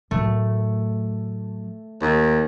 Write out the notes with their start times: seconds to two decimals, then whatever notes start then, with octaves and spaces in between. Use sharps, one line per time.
0.11 A2 F#3 A3
2.02 D#2